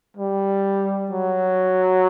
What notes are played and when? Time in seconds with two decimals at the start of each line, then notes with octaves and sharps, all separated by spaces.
0.17 G3
1.11 F#3